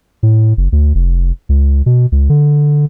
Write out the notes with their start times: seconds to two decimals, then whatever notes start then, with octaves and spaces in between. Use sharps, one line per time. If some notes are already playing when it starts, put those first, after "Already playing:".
0.23 A2
0.57 F#1
0.72 D2
0.95 F1
1.49 C#2
1.86 B2
2.12 C#2
2.29 D3